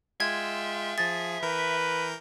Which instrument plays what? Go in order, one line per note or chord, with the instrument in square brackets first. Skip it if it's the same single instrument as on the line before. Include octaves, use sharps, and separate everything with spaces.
[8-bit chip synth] G#3 F4 G5 [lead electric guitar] E5 [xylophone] G#6
[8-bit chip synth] F3 G#4 [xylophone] A6
[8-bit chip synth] E3 A#4 G6 [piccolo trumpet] B4